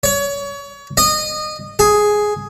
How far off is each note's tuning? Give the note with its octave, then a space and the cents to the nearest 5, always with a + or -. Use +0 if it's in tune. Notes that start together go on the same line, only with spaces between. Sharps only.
C#5 +30
D#5 -25
G#4 +5